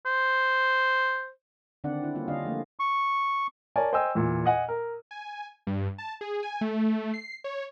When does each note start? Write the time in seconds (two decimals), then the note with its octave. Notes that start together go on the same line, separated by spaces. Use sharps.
0.05 C5
1.84 D3 D#3 C4 D4 D5 F#5
2.02 D4 E4
2.15 G3 A#3 C#4 F4
2.28 D3 D4 F4 D#5 F5
2.44 F3 A3 A#3
2.80 C#6
3.76 A#4 C#5 D5 G#5 A5
3.93 C5 D#5 G5 G#5 E6
4.15 E2 A#2
4.46 D#5 F#5 G#5
4.69 A#4
5.11 G#5
5.67 G2
5.98 A5
6.21 G#4
6.43 G#5
6.61 A3
7.14 C7
7.44 C#5